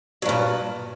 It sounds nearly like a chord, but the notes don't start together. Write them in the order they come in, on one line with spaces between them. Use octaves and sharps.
F#3 G2 A#2